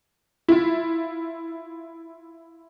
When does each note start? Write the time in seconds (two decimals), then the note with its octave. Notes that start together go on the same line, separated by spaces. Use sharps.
0.48 E4 F4